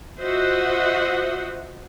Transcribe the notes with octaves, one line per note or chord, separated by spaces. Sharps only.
F4 F#4 C5 D#5 E5 F#5